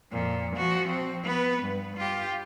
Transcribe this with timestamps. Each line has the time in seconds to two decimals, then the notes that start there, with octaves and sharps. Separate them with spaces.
0.11 F2 A#2
0.56 F3 F#4
0.89 C4
1.23 B3 B4
1.62 G2
1.97 F4 G4